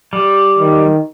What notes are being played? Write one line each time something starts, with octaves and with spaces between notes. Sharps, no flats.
G3
D#3